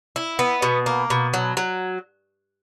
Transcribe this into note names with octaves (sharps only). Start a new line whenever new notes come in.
E4
B3
B2
A#3
B2
F#3
F#3